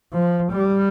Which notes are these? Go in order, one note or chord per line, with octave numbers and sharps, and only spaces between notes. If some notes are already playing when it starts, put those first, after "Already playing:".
F3
G3